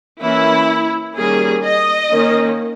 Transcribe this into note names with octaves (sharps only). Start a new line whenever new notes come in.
E3 A#3 C#4 E4
D#3 G3 A#3 C#4 G#4
D#5
D#3 A#3 C#4